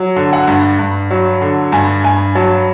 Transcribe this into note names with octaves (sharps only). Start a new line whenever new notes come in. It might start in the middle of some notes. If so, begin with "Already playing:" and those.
Already playing: F#3
D3
F#5
G2
G2
F#3
D3
G2 G#5
G2 G#5
F#3 A5